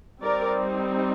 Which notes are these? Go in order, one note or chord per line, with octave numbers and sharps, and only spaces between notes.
G3 C4 D#4 A#4 D5